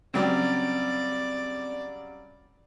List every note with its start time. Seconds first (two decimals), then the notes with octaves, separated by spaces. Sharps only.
0.14 C#3 F#3 G3 C4 D5